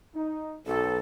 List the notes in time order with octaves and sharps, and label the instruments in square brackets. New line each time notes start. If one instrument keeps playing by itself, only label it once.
[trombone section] D#4
[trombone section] B1 [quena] A4